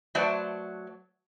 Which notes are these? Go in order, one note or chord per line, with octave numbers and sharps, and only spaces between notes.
F#3 A3 B4 C5 D5 A5